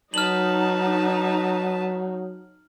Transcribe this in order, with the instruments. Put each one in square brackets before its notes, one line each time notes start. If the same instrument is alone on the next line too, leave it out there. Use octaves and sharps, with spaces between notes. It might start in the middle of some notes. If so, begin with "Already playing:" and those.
[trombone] F#3 [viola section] D#4 [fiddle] B4 A5 [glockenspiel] F6 F#7